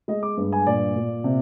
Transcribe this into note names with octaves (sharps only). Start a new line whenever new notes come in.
G#3 D#5
D6
G2
G#5
A#2 D5
A#2
C3